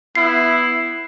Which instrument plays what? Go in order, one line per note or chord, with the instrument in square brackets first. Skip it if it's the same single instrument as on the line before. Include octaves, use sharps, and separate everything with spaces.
[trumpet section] B3 E4 [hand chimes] C7